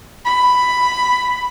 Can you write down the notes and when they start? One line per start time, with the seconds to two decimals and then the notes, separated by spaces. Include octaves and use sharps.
0.25 B5